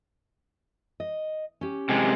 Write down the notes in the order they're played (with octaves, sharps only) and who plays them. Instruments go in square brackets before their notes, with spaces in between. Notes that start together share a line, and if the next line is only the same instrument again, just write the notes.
[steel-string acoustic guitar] D#5
C#4 G4
[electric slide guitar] C3 G#3